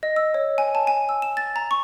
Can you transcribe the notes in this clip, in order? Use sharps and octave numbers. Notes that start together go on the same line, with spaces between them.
D#5
E6
C#5
G#5
A5
G#5
E6
E7
A6
A#5
C#6